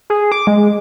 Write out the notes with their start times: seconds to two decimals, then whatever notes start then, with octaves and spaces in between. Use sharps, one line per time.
0.10 G#4
0.32 D6
0.47 G#3